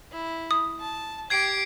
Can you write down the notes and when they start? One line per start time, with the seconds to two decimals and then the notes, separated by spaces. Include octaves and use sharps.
0.12 E4
0.51 D#6
0.80 A5
1.30 G4 G#6 C7 D7